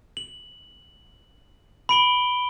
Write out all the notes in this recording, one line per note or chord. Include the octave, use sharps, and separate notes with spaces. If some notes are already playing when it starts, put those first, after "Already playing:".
F#7
B5 D7 G7